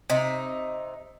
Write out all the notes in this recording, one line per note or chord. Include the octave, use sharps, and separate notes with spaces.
C3 D#4